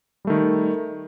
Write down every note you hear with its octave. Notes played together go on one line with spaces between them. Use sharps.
D#3 G3 A3